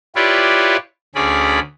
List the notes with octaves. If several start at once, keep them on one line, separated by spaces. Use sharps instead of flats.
E4 F4 G4 B4 C#5 D5
D2 C#4 G#4 D5 B5